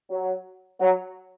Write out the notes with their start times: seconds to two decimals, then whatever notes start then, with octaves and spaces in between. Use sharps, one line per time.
0.11 F#3
0.81 F#3